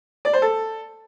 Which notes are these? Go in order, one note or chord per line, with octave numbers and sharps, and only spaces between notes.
D5
C5
A4